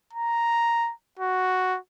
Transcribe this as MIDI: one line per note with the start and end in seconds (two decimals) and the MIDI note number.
0.14 0.92 82
1.19 1.79 66